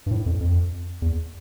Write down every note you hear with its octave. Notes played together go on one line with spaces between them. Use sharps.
G2
A2
F2
F2
E2